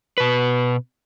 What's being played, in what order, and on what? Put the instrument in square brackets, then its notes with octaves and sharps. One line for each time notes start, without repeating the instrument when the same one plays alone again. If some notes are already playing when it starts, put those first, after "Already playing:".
[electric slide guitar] B2 B4